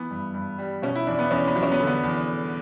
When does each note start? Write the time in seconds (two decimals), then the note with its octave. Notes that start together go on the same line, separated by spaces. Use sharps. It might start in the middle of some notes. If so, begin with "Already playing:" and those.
Already playing: E3 B3
0.11 G2
0.34 G2
0.59 G3
0.82 B2 C#4
0.95 E4
1.07 E2 D4
1.19 B3
1.31 E2 C#4
1.48 B3
1.56 F#3
1.63 C#4
1.72 B3
1.80 D3
1.87 B3
2.04 E2